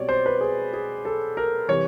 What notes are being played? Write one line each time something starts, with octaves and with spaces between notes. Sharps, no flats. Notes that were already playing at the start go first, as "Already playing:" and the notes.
Already playing: B2 G3 C4 C#5 D5
C5
B4
G#4
G#4
A4
A#4
C3 E3 G3 C#5